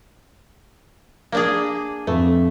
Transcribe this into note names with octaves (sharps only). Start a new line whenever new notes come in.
A#3 D4 G#4
F2 A3